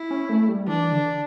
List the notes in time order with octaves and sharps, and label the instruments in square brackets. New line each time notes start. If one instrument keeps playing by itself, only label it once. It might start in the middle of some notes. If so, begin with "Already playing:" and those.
Already playing: [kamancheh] E4
[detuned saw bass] C#4
A3
G3
[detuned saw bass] E3 [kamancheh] D4
[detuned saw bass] D3